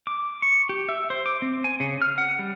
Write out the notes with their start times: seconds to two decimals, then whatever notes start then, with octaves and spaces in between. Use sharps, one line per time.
0.07 D6
0.42 C#6
0.69 G4
0.89 E5
1.10 C5
1.26 D6
1.42 C4
1.64 G#5
1.80 C#3
2.02 F6
2.18 F#5
2.39 G3